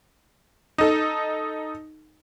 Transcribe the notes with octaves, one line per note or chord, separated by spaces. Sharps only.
D#4 A4